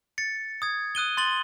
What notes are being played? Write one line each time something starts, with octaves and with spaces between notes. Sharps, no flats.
A6 C#7
D#6 G#6
D#6 F#6 D#7 G7
C6 A6 F#7 G7